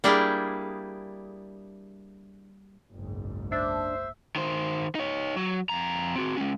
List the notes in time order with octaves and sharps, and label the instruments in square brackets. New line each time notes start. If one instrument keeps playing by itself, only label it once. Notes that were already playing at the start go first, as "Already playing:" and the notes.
[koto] G3 A#3 D4 E4 G4 G#4
[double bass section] F#1 B1 G#2
[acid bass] D4 [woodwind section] C5 [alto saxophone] E5
[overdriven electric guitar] D#3 C5
D#4 C#5
F#3
F2 A#5
C4 F#4
G#3 C#4